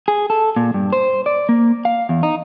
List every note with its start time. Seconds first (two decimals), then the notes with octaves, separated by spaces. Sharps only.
0.08 G#4
0.30 A4
0.56 A#2
0.74 G2
0.93 C5
1.26 D5
1.49 A#3
1.85 F5
2.09 E2
2.23 D#4